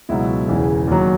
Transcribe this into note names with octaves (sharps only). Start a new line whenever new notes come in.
C#2 B2 F#3 E4
E1 E2 C#3 E3
D#2 D#3 F#3